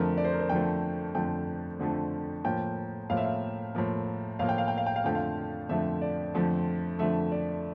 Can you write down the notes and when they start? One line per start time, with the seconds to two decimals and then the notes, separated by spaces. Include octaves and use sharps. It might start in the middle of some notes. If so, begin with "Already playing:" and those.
Already playing: F2 D3 F3 A3 A#4
0.17 D5
0.25 C5
0.33 A#4
0.40 C5
0.49 F2 D3 F3 A3 G5
1.15 F2 D3 F3 A3 G5
1.79 F2 D3 F3 A3
2.44 A2 F3 A#3 G5
3.09 A2 F3 A#3 F5
3.17 E5
3.25 F5
3.75 A2 F3 A#3
4.39 A2 F3 A#3 F5
4.49 G5
4.58 F5
4.68 G5
4.78 F5
4.86 G5
4.96 F5
5.04 F2 D3 F3 A3 G5
5.15 F5
5.69 F2 D3 F3 A3 E5
6.02 D5
6.34 F2 D3 F3 A3
6.99 F2 D3 F3 A3 E5
7.32 D5